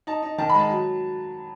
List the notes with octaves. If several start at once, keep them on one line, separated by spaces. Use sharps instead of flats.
D#4 A5
D#4
D#3 A5
B5
G#3 A5
F#3